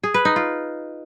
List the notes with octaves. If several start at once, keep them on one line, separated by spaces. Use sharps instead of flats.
G#4
B4
D#4
F4